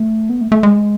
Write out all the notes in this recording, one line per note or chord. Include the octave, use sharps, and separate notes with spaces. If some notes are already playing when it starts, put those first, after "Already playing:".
Already playing: A3
B3
A3
A3
G#3